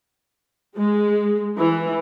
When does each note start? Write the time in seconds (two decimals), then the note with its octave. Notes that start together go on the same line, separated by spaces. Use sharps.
0.77 G#3
1.59 E3